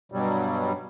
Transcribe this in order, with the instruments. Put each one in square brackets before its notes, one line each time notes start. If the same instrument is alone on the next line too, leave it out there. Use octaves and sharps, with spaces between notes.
[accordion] G2 B2 F#3 G3